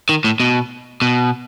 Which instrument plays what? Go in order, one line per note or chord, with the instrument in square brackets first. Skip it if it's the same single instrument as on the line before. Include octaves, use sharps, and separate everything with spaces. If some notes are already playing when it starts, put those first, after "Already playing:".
[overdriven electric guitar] D#3
A2
B2
B2